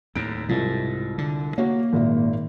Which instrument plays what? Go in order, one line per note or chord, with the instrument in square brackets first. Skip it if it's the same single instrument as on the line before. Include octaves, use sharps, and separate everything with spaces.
[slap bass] D#2 A2 [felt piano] D7
[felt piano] C2 F4 [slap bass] G#2
[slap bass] D3
[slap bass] A#3 [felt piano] F#4 C#5
[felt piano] G#1 A#2 E5